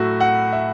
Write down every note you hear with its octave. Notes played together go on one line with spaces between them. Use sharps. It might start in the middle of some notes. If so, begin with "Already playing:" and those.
Already playing: A2 F#3 A3 E4 F#4
F#5
E5